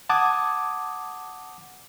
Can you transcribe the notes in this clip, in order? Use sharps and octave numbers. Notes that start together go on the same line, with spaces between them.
F#5 A5 D6 D#6 G#6